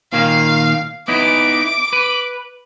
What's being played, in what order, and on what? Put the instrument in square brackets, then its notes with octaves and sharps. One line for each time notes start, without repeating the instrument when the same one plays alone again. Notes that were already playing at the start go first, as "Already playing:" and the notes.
[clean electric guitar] A#2 D#3 A#3 [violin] F5
[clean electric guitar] B3 D#4 E4 [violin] D6
[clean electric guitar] B4